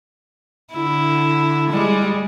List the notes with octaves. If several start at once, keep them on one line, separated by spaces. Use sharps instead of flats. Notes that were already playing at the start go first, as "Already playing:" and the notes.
D3 E4
G3 G#3